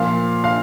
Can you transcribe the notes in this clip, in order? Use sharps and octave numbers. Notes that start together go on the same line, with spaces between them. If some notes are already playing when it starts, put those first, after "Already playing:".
Already playing: A#2 F3 F5
F5